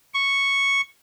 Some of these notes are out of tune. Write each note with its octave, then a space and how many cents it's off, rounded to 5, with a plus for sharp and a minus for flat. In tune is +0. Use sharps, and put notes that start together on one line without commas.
C#6 -5